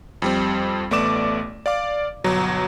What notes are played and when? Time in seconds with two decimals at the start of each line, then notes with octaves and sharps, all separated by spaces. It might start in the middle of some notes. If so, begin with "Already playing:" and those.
0.22 F2 G3 C4
0.91 A1 A3 B3 D5 D6 E7
1.66 D5 F5 D6
2.24 G1 B2 F#3 A#5